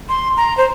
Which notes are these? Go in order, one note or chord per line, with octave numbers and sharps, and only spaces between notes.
C6
A#5
C5